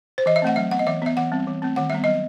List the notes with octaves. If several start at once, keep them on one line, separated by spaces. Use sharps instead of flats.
C5
E3 D#5
E5
A3 C4 F#5
F#3 E5
B3 F#5
D#5
E3 E5
B3 E5
E3 F#5
G3 C4
E3
A3 C4
D#3 F#5
G3 B3 E5
F#3 D#5